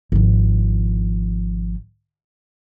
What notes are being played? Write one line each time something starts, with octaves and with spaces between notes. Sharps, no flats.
G#1 F3